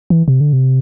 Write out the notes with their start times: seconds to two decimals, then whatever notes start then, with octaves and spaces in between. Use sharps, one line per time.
0.10 E3
0.28 C3
0.41 D3
0.53 C3